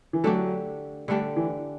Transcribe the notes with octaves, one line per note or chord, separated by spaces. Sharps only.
E3
D3 F#3 A3 D4 G4
D3 G3 A3 D4 G4
E3